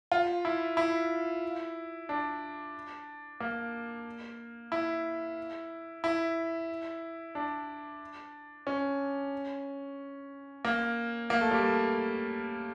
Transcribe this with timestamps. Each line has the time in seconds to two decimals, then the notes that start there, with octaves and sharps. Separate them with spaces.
0.12 F4
0.45 E4
0.77 E4
2.09 D4
3.40 A#3
4.72 E4
6.04 E4
7.35 D4
8.67 C#4
10.65 A#3
11.30 A#3
11.41 A3
11.51 G3
11.62 A3